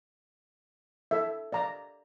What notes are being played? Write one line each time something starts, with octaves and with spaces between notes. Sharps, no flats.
A4 E5
D5 F5 A#5